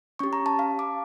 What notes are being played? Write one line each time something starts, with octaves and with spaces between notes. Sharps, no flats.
C#4 G4 C#6
A#5
A5
F5
D6